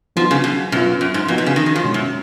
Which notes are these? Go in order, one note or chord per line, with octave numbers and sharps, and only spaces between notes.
F3 F#3 B3 D#4 F#4
C#3
B2
F#2 B2 F#3 B3 F4
F#2
G#2
A#2 F3 B3 D#4 F#4
B2
C#3
D#3
D#3
F3
B2 G#3 C#4 F#4
F#2